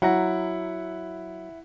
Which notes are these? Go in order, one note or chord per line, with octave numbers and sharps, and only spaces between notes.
F#3 E4 F#5 A#5